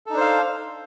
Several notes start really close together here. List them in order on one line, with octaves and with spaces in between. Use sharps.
A4 D#4 D4 C5 F5